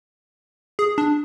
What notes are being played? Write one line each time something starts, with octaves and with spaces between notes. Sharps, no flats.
G#4
D4